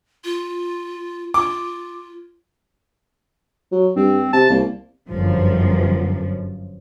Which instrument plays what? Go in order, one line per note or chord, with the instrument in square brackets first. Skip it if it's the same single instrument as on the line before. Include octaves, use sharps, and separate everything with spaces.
[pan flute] F4
[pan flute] F4 [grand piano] D6
[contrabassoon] F#3
[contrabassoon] G2 [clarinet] C4
[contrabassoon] C3 [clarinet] A5
[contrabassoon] C2 [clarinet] A#3
[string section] G1 F#2 F3